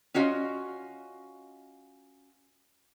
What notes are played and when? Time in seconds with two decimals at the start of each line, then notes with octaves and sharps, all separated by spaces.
0.14 C#4 F4 F#4 D#5